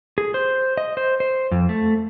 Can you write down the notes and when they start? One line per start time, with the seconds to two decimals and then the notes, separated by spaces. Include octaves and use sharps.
0.18 G#4
0.34 C5
0.77 D#5
0.97 C5
1.20 C5
1.51 F2
1.69 A3